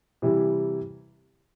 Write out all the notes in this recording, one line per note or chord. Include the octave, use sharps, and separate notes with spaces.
C3 E3 G3 E4